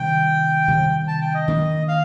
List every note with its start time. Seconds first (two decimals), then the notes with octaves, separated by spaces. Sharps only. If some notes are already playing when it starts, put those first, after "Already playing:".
Already playing: C3 D#3 G3 D4 G5
0.68 C3 D#3 G3
1.08 A5
1.21 G5
1.35 D#5
1.48 D#3 A#3 D4
1.88 F5